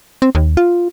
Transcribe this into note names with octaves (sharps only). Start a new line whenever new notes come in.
C4
D#2
F4